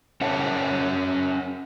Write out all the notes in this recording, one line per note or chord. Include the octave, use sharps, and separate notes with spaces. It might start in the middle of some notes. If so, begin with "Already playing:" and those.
C#4 A#4 C#5 E5 F#5 A5